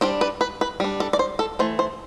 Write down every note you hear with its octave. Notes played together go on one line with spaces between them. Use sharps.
G3 D4 C5
B4
B4
B4
G3 D4
A4
D5
C5
A4
E3 A3 C5
C5